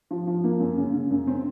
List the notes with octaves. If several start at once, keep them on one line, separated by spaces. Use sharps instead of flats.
F3
F3
A#3
F#2
C#3
C#3
F#2
C4